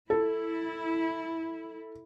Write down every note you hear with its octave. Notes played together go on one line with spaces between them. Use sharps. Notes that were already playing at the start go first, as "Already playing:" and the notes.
E4 A4